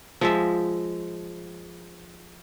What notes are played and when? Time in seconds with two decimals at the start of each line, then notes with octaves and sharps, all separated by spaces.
0.21 F3 G#3 E5